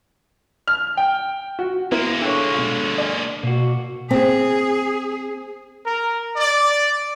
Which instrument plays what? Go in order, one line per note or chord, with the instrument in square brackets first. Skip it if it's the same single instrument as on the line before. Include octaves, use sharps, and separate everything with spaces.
[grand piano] F6
G5
F#4
[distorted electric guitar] G#3 A#3 [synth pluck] B3 E4 A#4
[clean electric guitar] D3 C#5 [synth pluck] E5 G5 A5
[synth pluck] B2 F4
D5 G#5
[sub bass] B2 [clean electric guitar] A#3 F#4
[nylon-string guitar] C4 [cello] G#4
[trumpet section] A#4
D5